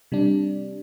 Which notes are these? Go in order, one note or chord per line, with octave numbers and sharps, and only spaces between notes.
C3 G3 D4